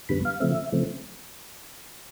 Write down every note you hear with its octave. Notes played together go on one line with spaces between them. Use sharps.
F#2 D3 G3 B3 B5
F5
C#3 F3 A3 C4 E5
C#3 F3 A3 C4